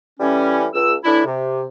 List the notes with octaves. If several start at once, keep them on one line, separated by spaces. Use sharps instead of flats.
A2 E3 G3 C#4
C#2 E6
A2 E3 D4 E4
C3